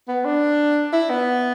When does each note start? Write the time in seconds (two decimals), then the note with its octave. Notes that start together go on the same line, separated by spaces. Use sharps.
0.08 B3
0.25 D4
0.93 E4
1.10 B3